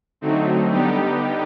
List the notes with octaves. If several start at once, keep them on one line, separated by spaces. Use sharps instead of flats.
D3 F#3 A3 C4 D#4
D3 G3 B3 D#4 G4